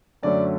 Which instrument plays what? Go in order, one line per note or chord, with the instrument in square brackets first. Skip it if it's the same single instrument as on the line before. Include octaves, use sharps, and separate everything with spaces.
[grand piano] F#2 D3 F#3 A3 C#4 D5